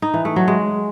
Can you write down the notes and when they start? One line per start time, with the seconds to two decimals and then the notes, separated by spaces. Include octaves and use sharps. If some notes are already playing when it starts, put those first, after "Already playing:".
0.02 D#4
0.14 E3
0.25 A3
0.36 F#3
0.48 G#3